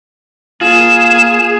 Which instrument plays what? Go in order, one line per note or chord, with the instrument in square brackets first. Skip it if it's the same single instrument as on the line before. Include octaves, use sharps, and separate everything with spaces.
[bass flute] A#3 [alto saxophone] F4 [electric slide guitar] G#4 [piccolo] E7